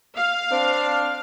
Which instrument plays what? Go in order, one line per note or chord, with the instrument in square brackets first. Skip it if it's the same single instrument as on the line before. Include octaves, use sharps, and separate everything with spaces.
[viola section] F5
[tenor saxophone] C4 [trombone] D4